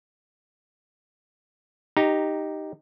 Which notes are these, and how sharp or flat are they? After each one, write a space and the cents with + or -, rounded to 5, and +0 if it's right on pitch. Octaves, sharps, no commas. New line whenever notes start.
D#4 +0 G4 +0 A#5 -10